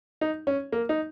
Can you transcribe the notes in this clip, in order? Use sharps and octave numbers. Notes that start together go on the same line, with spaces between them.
D#4
C#4
A#3
D#4